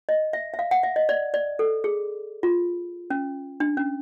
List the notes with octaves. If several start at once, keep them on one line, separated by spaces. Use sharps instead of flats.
D#5
E5
E5
F5
F#5
E5
D#5
D5
D5
A4
G#4
F4
C#4
D4
C#4